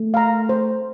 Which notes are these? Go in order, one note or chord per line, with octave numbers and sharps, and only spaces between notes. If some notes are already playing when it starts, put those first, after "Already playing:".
Already playing: A3
F5 A#5
C5